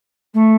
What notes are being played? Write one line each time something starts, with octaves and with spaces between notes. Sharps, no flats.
A3